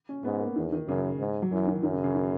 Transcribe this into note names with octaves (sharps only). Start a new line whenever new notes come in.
C#4
G#2 B3
A#3
E2 D#3
D#3
F#2 C#3
G#2
F#3
F#2 E3
D#3
F#2 D#3
C#3
C#3
D#3